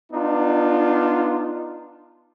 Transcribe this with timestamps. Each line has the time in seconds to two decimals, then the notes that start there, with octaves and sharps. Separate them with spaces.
0.12 B3 D4 D#4 F4